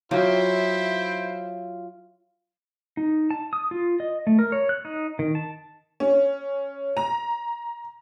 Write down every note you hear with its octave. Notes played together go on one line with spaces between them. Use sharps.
F#3 E4 F4 C5 E5 G5 D#6
D#4
A5
D#6
F4
D#5
A3
A#4
C#5
F#6
D#4
D#3
A5
C#4
A#5